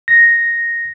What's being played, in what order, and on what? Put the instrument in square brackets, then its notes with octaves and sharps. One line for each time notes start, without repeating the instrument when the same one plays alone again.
[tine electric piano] A#6